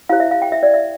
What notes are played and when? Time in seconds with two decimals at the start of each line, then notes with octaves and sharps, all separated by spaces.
0.09 E4 G4 C5 F5
0.20 E5
0.31 F5
0.42 G5
0.52 E5
0.63 D5
0.74 E5